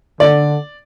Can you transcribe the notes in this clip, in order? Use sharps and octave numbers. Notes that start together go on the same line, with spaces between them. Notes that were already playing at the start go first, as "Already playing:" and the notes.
D3 D5